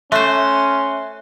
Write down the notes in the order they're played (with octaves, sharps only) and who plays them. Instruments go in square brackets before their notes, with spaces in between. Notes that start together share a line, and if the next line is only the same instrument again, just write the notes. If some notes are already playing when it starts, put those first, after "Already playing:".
[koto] A3 C5 [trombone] C#4 [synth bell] E5 F#6 [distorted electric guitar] C6